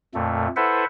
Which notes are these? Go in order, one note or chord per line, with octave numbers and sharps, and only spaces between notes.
F2 A#2 A3
E4 A4 B4 C5 E5 F#5